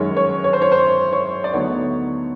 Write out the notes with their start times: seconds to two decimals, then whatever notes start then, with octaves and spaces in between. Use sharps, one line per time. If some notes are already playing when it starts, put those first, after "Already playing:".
Already playing: F#2 D#3 G#3 C#5
0.17 C#5
0.44 C#5
0.53 C5
0.62 C#5
0.72 C5
1.13 C#5
1.44 D5
1.54 D2 D3 F#3 B3 D#4 C#5